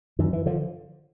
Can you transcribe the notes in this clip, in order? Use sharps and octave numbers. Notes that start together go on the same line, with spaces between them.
F#2 D#3
E3
D3 F3